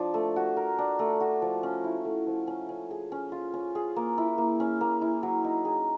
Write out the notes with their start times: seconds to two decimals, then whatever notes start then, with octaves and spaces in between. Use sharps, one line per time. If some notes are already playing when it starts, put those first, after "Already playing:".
Already playing: F3 D4
0.14 A3
0.36 F#4
0.57 A#4
0.78 D4
0.99 A3
1.20 F#4
1.42 F3
1.63 C#4
1.84 E4
2.05 A3
2.27 F3
2.47 C#4
2.69 C#4
2.91 G#4
3.12 C#4
3.32 F4
3.54 C#4
3.75 G#4
3.96 A#3
4.18 E4
4.38 A#3
4.60 C#4
4.81 A#3
5.02 E4
5.23 F#3
5.44 D#4
5.65 G#4